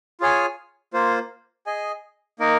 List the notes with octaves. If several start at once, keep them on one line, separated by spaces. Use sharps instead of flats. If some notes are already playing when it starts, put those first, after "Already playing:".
F4 G#4 C#5 G#5
A#3 F4 C5
G#4 D#5 G#5
A#3 D#4 A#4